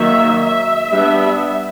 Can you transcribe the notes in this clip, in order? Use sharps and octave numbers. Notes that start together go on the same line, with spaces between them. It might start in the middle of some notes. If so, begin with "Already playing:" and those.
Already playing: D#3 F#3 A#3 E5
E5
G3 B3 D4